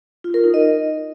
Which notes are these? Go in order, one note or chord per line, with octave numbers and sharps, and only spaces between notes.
F4
A#4
D#4
D#5